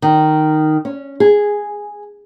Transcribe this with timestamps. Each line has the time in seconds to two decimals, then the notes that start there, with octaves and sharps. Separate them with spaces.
0.02 D#3
0.85 C#4
1.20 G#4